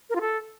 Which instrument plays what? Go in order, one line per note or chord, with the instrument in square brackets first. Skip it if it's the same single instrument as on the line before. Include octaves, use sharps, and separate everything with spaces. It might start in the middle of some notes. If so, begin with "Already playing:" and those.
[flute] A#4
F4
A4